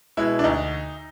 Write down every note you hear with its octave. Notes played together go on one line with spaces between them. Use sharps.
B2 G#3 E4
D4
D2 D#4